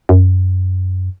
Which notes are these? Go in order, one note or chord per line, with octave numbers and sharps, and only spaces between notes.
F#2